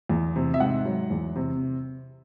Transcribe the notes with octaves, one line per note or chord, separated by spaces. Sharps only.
E2
C3
E5
G#2 F#5
F#3
E2
C3